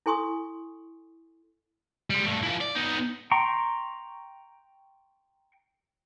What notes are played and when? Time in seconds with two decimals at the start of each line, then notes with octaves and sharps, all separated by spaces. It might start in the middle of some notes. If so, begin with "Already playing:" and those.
0.06 E4 A4 G#5 C6 C#6 D#6
2.10 G3 G#3
2.26 G2 A3
2.43 F3 E4
2.61 D5
2.76 B3 D#4
3.31 G5 A#5 C6 C#6